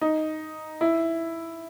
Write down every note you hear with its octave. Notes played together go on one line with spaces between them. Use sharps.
D#4
E4